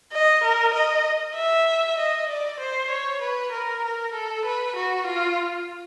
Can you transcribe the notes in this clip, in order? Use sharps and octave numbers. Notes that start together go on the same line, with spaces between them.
D#5
A#4
D#5
E5
D#5
D5
C5
C#5
B4
A#4
A#4
A4
B4
F#4
F4